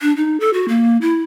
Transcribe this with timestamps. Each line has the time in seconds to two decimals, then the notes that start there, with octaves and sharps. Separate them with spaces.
0.01 D4
0.16 D#4
0.40 A4
0.54 F#4
0.68 A#3
1.01 E4